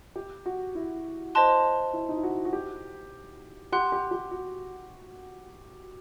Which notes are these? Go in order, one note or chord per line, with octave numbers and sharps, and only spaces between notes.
G4
F#4
E4
C5 D#5 A5 C6 F#6
E4
D#4
E4
F#4
F#4
G4
G4 F#5 C6 F#6
G4
G4
F#4